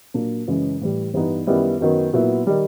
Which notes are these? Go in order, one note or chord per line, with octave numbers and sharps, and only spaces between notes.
A#2 F#3 A#3 D4
F#2 C#3 E3 G#3 C#4
A2 E3 G3
G2 E3 G3 B3 D#4
F#2 D#3 G3 B3 E4
F#2 D#3 F#3 B3
A#2 F#3 B3 E4
D#3 G3